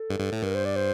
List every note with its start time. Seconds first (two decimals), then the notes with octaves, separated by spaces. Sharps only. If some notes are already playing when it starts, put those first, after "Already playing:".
Already playing: A4
0.10 G2
0.20 G2
0.32 A2
0.42 G2 A#4
0.55 C5
0.66 D5
0.76 C5